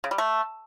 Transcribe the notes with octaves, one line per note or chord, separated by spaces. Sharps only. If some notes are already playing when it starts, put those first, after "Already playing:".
C#3
G3
A3